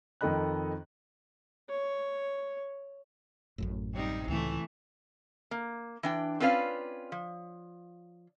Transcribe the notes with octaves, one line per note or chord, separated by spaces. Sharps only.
F2 D#3 A4 D#5 B5 F#6
C#5
A1 F#2 A2
C3 G3 D#4
C#2 A2 E3 A3
A#3
E3 D4 G5
C4 C#4 F4 B4 D5 F5
F3